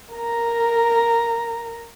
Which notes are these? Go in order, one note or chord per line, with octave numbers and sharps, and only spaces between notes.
A#4 A#5